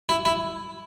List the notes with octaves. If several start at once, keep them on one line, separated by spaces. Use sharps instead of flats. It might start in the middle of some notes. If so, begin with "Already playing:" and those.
E4
E4